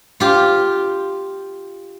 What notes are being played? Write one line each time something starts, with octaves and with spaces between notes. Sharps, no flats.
F4 G4